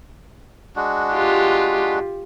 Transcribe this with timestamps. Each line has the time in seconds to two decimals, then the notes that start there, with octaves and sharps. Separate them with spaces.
0.76 G#3 D4 F#4
1.12 F4 G4